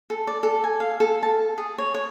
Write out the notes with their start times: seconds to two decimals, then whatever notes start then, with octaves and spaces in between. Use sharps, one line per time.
0.10 A4
0.27 D5
0.43 A4
0.64 G#5
0.80 F5
1.00 A4
1.23 A5
1.58 G#4
1.78 C#5
1.94 C#5